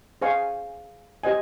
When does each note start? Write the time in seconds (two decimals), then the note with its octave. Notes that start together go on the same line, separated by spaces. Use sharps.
0.22 G#4 C5 F5 G#5 C#6
1.23 G4 C5 D#5 G#5